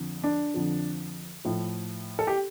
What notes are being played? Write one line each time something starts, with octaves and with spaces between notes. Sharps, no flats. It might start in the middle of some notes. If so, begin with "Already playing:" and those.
Already playing: F2 D3 F3
D4
F2 D3 F3
A2 F3
A4
G4